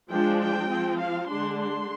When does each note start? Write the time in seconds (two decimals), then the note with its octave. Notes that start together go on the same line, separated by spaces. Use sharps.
0.10 F3 G#3 D4 G5
0.39 G5
0.69 F3 C4
0.99 F5
1.28 D3 G#3 D4 C6
1.58 C6